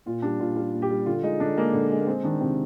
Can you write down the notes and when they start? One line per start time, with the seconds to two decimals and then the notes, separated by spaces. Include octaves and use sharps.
0.06 A#2 F4
0.22 G3 D4
0.39 A#2 F4
0.56 G3 F4
0.74 A#2
0.82 G4
0.90 G3
1.06 D3 F4
1.23 G#3 D#4
1.40 D3 D4
1.57 G#3 A#3
1.73 D3
1.91 G#3
2.00 A#3
2.07 G#3 C4
2.24 D#3 D4
2.41 C3 C4